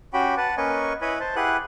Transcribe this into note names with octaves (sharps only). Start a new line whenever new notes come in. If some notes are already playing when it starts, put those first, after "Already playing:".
C#4 F#4 G4 G5 B5
B4 F#5 A5
A#3 C#4 B4 D#5 G#5 C#6
E4 B4 C#5 D#5 G#5 B5
C5 A5
E4 G4 G#4 B4 F#5 F#6